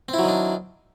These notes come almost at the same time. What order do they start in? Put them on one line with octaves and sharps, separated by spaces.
C4 E4 F#3 D#3 D4